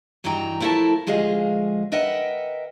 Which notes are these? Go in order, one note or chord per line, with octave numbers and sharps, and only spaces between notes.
G2 E3 D#4 F#4 G5 A#5
F3 A3 E4 A4 A#4 A5
D2 F3 G#3 G#4 D#5 F5
A#4 B4 D#5 E5 F#5 G5